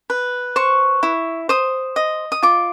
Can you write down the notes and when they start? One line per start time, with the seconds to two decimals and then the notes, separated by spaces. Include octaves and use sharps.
0.10 B4
0.56 C5 C#6
1.03 E4
1.49 C5 D#6
1.96 D#5
2.32 D#6
2.43 F4 D6